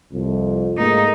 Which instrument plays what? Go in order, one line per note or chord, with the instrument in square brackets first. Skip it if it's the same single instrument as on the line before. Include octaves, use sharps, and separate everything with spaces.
[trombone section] C2 F2
[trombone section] G#2 A3 A#3 [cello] D#4